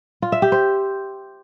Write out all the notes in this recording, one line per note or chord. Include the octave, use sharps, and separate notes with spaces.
F4
E5
G4
C5